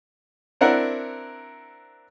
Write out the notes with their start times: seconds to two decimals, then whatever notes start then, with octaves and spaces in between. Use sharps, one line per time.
0.61 C4 D4 E4 A#4 F#5